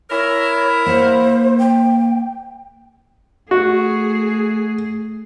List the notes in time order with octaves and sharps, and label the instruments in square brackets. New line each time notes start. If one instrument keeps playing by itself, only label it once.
[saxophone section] E4 A#4 [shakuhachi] C#5
[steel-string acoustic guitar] A#3 F#5 [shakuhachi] C5
[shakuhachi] G5
[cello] A3 G#4 [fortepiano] F#4